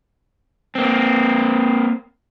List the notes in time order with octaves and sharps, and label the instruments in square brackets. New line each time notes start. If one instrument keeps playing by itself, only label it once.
[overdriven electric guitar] A#3 C4